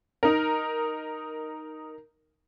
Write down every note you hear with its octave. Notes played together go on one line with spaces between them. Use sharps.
D#4 A#4